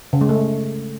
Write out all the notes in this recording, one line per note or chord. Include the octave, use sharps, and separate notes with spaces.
C#3
G#3
A3